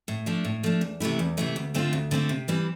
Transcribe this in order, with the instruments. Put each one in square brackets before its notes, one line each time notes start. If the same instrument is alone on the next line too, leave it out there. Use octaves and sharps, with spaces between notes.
[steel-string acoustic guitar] A2
F3 A3 D4
A2
F3 A3 D4
E2
C3 E3 A3 E4
E2
C3 E3 A3 E4
D2
D3 A3 C4 F4
D2
D3 A3 C4 F4
C3
E3 G3 C4